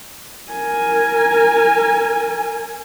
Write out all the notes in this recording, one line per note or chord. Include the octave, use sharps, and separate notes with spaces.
A#4 G#5